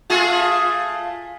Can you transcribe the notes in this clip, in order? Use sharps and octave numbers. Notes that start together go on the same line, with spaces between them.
A3 F4 G#4